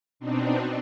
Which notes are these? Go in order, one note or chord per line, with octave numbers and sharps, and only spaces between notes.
B2 C4 D4 D#4